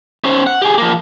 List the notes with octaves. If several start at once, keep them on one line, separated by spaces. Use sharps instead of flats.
C#4 C5
F#5
G4 G#4
F3 A#3